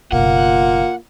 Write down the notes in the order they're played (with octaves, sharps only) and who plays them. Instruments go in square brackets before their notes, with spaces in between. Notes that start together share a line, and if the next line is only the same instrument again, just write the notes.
[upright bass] F#1 B2 [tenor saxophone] A#3 [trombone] F4 [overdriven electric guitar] F#5